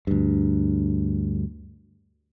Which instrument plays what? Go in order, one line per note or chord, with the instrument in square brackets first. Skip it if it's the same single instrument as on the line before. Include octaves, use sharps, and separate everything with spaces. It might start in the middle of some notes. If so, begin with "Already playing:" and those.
[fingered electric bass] D2 G2